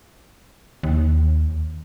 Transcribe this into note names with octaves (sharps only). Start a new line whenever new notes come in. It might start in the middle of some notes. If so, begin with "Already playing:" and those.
D#2